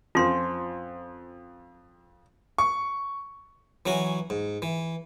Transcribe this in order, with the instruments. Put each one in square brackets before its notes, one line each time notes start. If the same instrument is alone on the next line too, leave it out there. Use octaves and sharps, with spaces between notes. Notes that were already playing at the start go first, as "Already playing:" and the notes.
[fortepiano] F2 [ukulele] C#4 C5 [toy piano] F4 C6
[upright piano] C#6
[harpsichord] E3 F#3 C#4 F#4 G#5
G#2
E3